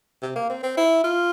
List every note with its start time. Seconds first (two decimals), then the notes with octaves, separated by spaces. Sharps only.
0.22 C3
0.36 A#3
0.50 C4
0.63 C4
0.77 E4
1.04 F4